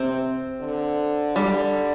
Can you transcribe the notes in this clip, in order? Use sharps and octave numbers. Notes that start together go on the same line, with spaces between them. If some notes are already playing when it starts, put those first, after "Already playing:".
Already playing: C3 C4
D3
G3